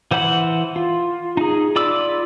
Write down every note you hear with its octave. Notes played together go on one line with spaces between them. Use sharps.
E3 C5 F#5 B5
F4
D#4 G#4
F4 D5 B5 D6 E6